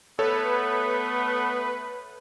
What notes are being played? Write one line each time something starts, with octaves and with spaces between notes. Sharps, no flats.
A3 B3 A4 B4 C#5